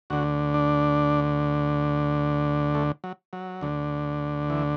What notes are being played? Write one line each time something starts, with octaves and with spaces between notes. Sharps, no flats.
D2 D3 F#4
D4
A3
F#3
F#3
D2 D3
E3